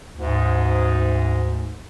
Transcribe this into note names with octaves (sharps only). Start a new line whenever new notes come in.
D2 G#2